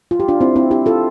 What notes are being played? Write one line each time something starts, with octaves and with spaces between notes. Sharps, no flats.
F4
G4
D4 F4
C4 E4
C4 E4
E4 G4
F4 A4